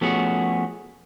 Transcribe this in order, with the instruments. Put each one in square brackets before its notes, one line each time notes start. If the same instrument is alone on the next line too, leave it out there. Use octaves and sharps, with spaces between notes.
[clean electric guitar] F3 A3 B3 C#4 F#4 G#4